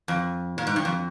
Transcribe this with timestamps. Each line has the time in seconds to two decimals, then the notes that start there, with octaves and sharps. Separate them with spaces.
0.08 F2
0.58 A#2
0.67 G#2
0.76 G2
0.85 F2